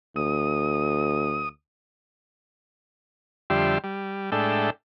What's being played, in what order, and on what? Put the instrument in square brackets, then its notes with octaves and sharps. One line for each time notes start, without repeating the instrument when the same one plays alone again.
[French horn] D2 [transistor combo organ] D#6
[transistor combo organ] F2 D3 G3 G4 E5 C6
G3
A2 G#3 D4 A4 E5 G5